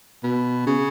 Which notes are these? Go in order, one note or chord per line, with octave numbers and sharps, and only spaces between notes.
B2
C#3